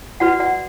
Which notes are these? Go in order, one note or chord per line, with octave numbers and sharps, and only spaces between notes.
F#4 B4 D5 F#5
D5 F#5